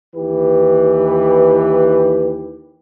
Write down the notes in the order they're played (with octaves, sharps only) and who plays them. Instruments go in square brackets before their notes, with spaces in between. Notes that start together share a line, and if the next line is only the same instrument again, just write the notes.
[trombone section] D#2 E3 G4 B4